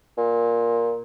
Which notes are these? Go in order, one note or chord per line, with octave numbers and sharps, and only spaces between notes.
A#2